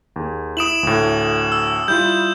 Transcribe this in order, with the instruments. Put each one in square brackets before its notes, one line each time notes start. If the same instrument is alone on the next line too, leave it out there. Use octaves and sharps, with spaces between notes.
[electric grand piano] D#2 G#4
[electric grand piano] E4 D7 [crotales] D#6 E7 F#7
[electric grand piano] D2 A2
[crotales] E6
[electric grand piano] G3 E4 F4 [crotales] G6